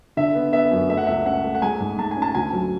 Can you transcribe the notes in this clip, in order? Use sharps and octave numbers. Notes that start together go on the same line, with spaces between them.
D3 E5
B3
B3 E5
F#2
A3 E5
F#5
C#2 E5
C#4 F#5
A3
F#5
G#3 G#5
G#2
G#3 A5
G#5
C#4
A5
D2 G#5
F#3